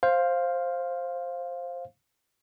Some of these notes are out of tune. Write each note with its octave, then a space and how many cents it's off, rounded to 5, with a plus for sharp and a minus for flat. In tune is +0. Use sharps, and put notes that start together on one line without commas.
C5 +10 F5 +0